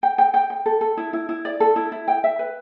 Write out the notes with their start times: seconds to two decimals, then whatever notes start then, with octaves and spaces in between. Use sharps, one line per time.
0.03 G5
0.18 G5
0.34 G5
0.50 G5
0.66 A4
0.81 A4
0.97 E4
1.13 E4
1.29 E4
1.45 D5
1.60 A4
1.76 E4
1.92 E4
2.08 G5
2.24 E5
2.39 B4